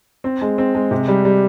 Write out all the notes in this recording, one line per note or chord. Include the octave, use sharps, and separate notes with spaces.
C4
G#3
C4
G#3
C3
G3
G3